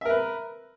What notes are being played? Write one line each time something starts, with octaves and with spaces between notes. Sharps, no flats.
A#4 B4 E5